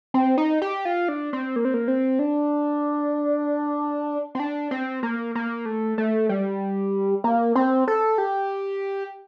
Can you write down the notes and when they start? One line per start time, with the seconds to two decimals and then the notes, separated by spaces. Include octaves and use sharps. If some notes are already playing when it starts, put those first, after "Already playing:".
0.14 C4
0.38 D#4
0.62 G4
0.85 F4
1.09 D4
1.33 C4
1.56 A#3
1.65 C4
1.74 A#3
1.88 C4
2.19 D4
4.35 C4
4.40 D4
4.71 C4
5.03 A#3
5.35 A#3
5.66 A3
5.98 A3
6.29 G3
7.24 A#3
7.56 C4
7.88 A4
8.18 G4